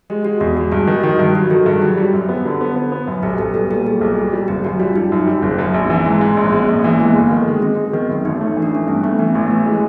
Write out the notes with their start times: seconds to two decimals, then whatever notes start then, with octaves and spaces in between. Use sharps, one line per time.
0.10 G#3 G4
0.25 G#3 F#4
0.41 E2 F#4
0.57 G#3 F#4
0.72 G2 F#4
0.87 D#3 G4
1.03 D#3 F#4
1.19 G2 G4
1.35 F#3 F#4
1.50 D#3 G4 A4
1.66 G2 G#4
1.81 F#3 G4
1.97 G3
2.13 F#2
2.29 B3
2.45 D3
2.61 B3
2.76 B3
2.92 B3
3.07 F#2
3.23 B1 G4
3.38 B1 G4 A4
3.54 G3 A4 B4
3.70 A#2 G4 A4
3.86 G3 G#4
4.01 B1
4.18 G3
4.33 G3
4.48 F#1 G4
4.64 F#2 F#4
4.79 G3 F4
4.96 G3 D#4
5.12 F#2
5.27 G3
5.42 F#1
5.58 F#2
5.74 A#1
5.90 E3
5.95 C4
6.06 G#2
6.16 C4
6.21 G#2
6.37 A#1 C#4
6.52 G#3 B3
6.68 A#1 A#3
6.84 E3 A#3
7.00 G#3 B3
7.15 G1
7.31 D#3
7.47 G#3
7.62 G#3 C4
7.78 G#3
7.93 D#3 B3
8.09 F#2
8.25 A1 D#4
8.41 A3
8.57 E3
8.62 D4
8.72 A3 C#4
8.88 G2 C4
9.03 A3 B3
9.19 E3 B3
9.35 A1 C4
9.50 E3
9.66 G#3